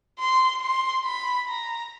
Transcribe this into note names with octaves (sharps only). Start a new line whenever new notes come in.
C6
C6
B5
A#5